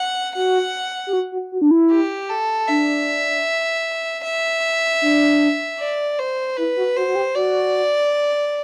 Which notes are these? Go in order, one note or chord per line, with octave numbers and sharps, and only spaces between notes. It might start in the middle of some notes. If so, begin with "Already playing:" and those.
Already playing: F#5
F#4 F#5
G4
F#4
F#4
F#4
D4
E4
G4
A4
D4 E5
E5
D4
D5
C5
E4 B4
F#4
F#4 C5
F#4
G4
F#4 D5